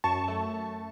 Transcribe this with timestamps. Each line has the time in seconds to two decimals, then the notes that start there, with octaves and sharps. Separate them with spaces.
0.04 F#2 A5 C#6
0.28 A3